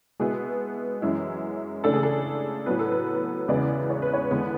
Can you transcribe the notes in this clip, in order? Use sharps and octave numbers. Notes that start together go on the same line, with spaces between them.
B2 G#3 B3 E4 G#4
F#2 E3 G#3 C#4 E4
C#3 E3 A3 D4 A4
G#4
A4
A2 F#3 B3 B4
A4
B4
E2 C#3 G#3 B3 E4 D5
C#5
B4
C#5
E2 D3 G#3 B3 B4